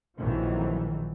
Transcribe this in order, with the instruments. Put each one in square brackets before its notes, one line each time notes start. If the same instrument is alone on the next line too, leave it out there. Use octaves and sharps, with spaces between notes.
[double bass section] A#1 F2 D#3 E3 F#3